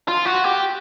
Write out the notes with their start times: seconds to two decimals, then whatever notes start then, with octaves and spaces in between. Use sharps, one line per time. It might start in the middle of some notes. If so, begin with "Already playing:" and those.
0.08 F4
0.25 F#4
0.44 G4